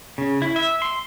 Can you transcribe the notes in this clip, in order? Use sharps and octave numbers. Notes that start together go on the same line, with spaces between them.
C#3
E4
E5
C6